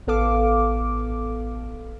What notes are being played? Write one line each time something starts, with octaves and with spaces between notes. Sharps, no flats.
A1 B3 A4 F5 D6